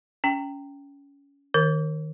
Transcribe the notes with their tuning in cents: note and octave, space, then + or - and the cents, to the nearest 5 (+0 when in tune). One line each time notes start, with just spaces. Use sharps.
C#4 +20 G5 +0
D#3 +0 A#4 +0